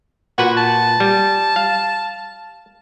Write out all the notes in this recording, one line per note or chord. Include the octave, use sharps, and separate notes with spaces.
A#2 F#4 B4 F#5
A5
G3
F5